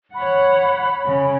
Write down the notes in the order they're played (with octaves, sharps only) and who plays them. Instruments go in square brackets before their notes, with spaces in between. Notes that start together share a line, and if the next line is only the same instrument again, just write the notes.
[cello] C#5 F#5 [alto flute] B5
[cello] C#3 C#4